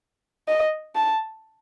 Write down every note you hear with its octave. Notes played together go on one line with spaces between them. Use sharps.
D#5
A5